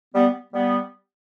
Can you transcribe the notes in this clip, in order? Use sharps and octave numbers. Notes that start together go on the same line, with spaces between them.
G3 B3
G3 B3